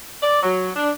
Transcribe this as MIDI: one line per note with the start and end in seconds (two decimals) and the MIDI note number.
0.23 0.39 74
0.43 0.70 54
0.76 0.90 62